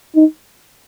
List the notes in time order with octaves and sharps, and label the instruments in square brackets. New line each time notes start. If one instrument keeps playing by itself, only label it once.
[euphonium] D#4